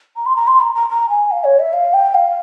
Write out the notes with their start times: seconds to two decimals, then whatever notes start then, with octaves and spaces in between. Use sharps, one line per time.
0.16 A#5
0.26 C6
0.36 A#5
0.47 C6
0.60 A#5
0.75 A#5
0.89 A#5
1.09 G#5
1.31 F5
1.44 C#5
1.59 E5
1.73 F5
1.93 G5
2.14 F5